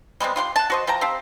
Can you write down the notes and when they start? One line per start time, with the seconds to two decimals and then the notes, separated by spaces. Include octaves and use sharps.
0.20 G3 G#3 B3 C4
0.36 F4 G4 F#5 C6
0.56 F#5 A5
0.70 F#4 C5 D#5
0.87 F3 G5 A5 A#5
1.01 C4 G4 F5 A5